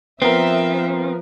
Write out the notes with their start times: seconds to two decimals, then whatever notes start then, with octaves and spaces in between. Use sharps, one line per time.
0.22 F3 B3 C4 A#4 E5